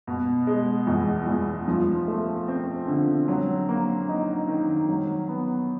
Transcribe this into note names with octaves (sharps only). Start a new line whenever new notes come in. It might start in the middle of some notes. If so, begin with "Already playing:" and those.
B2
G#3
E2
E2
F3
A3
C4
D3
F#3
A#3
D#4
D#3
F#3
B3